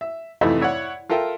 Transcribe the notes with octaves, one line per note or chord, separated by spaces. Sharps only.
E5
F2 C3 E3 A3 D#4 E4
E4 C#5 D5 F#5
F4 A4 A#4 E5 G5